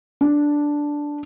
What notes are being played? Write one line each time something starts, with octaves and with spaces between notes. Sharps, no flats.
D4